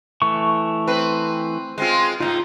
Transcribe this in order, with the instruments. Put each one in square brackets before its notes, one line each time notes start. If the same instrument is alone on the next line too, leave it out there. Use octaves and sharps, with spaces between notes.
[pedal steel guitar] E3 A3 C#6
[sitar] C4 B4
G#3 C4 F4
[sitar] G#2 B2 D#4 [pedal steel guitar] F4